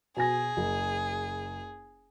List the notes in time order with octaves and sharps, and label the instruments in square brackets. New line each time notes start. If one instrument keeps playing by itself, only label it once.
[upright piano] B2 G#5 A#6 [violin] G#4
[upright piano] F#1